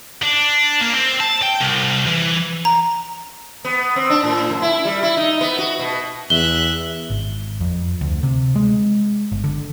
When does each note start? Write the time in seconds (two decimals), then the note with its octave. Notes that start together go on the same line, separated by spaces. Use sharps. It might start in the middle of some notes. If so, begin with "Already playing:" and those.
0.23 D4
0.81 A#3
0.95 C4
1.20 A5
1.42 G5
1.61 C2
2.07 E3
2.65 A#5
3.65 B3
3.96 C4
4.10 D4
4.24 A2
4.50 F#2
4.62 E4
4.85 G3
5.03 E4
5.17 D#4
5.41 B3
5.59 F#4
5.79 B2
6.30 E2 E5 F#6 G7
7.10 G#1
7.60 F2
8.01 D2
8.23 C3
8.56 G#3
9.32 G1
9.44 D3